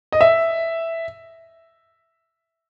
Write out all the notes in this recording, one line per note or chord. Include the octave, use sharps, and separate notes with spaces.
D#5
E5